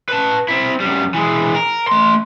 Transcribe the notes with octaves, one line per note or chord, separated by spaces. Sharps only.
B4 A5
C4 E4
F#2 G3
E3 G#3
A#4
A3 C6